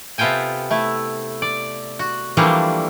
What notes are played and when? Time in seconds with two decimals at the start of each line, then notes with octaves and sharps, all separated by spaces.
0.18 C3 B3 F4 A4 G5 G#5
0.71 A3 E4
1.42 D5
1.99 F#4
2.37 E3 F3 G3 A3 A#3 D4